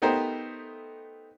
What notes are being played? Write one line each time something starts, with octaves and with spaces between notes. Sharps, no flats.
A3 B3 D#4 G4 A#4 C5